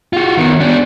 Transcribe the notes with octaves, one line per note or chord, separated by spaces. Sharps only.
F4 F#4
D#3 B3
B3 D4